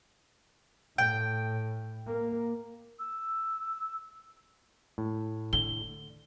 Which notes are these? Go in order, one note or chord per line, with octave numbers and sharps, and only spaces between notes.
A2 G5
A#3
E6
A2
D3 G7